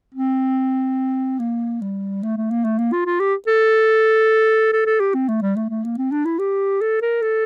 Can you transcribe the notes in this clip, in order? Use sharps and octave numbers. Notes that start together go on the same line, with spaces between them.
C4
A#3
G3
A3
A3
A#3
A3
A#3
F4
F4
G4
A4
A4
A4
G4
C4
A3
G3
A3
A3
A#3
C4
D4
E4
G4
A4
A#4
A4